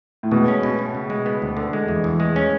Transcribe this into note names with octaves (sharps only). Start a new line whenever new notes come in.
A2
B2 G#3
C#4
B2
B2
C#3
G#3
B3
D2
D3
G#3
E2
E2
G#3
C#4